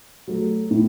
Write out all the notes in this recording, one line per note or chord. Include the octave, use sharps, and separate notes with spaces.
F#3 A3
A2